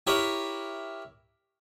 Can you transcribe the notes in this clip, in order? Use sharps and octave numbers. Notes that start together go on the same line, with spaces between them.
E4 G4 A#4 B4 C#5 E5